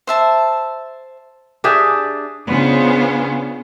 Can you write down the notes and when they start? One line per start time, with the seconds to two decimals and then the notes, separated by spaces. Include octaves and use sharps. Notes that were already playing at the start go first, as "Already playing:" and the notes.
0.07 C5 E5 A5
1.64 D4 G4 G#4 E5
2.47 C#3 B3 D4 F4 G#4 C5